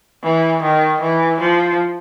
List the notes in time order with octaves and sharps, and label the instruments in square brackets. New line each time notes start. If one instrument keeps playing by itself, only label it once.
[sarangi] E3
D#3
E3
F3